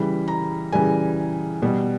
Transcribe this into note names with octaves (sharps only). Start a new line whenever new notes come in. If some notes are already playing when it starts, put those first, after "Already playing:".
Already playing: C#3 E3 G3 B5
A#5
C#3 E3 G3 G#5
B2 G3